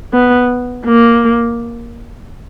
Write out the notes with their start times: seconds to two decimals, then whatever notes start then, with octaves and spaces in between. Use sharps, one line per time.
0.13 B3
0.86 A#3